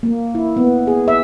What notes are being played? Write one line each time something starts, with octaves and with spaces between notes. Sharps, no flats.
A#3
E4
B3
G#4
E5